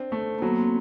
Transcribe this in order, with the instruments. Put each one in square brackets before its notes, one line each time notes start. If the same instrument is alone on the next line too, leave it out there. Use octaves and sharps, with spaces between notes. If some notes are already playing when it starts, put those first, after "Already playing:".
Already playing: [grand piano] C4 D4
A3
[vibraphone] A#3
[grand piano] F#3 [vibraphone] B3
[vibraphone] C4